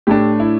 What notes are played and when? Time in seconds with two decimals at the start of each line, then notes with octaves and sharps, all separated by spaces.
0.07 A2 A3 D4 G4
0.40 E4